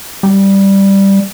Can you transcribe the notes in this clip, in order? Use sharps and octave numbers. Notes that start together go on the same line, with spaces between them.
G3